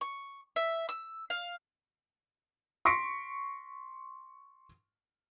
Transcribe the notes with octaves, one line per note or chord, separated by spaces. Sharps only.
C#6
E5
E6
F5
C6 C#6 A#6 B6 C#7 D7